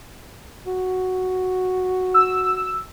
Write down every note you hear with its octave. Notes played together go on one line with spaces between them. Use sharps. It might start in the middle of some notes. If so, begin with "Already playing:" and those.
F#4
E6